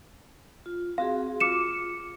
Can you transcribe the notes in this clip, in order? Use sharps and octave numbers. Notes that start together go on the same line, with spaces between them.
F4
C4 F#4 G#4 F5
F4 D6 C#7 E7